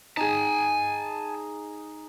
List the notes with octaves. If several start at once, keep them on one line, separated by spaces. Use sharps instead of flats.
D#4 G#4 G#5 A5